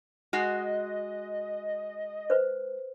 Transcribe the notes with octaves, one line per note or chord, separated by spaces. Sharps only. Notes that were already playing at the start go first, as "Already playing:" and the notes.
G#3 F#4 D#5
B4 C5